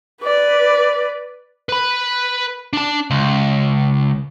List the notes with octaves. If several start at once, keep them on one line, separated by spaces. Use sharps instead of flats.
B4 D5
B4 B5
D4 A5
C#2